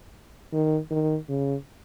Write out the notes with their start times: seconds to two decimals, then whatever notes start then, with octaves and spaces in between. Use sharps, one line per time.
0.53 D#3
0.91 D#3
1.29 C#3